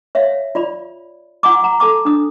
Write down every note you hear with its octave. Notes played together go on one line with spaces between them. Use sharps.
C#5 E5 F5
F4 D5 B5
F4 F#5 G#5 A#5 D6
F#5 A#5
A4 A5 D6
D4 D#6